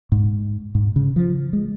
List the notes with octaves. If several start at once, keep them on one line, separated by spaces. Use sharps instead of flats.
G#2
G#2
C#3
F3
G#3